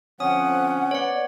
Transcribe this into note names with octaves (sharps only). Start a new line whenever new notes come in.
D3 F3 C4 C#4 F#5 D#6
B3 C#5 D5 F#5